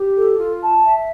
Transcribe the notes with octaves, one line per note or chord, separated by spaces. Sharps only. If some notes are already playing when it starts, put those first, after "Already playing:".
Already playing: G4
A4
F4
A5
E5